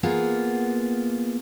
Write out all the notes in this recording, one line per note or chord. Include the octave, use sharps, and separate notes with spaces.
A#3 B3 F4 G#4